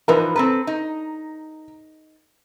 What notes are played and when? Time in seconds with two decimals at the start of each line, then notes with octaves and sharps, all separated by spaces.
0.08 E3 F3 D#4 A#4 B4
0.36 C4 A4 B4 A#5
0.67 D#4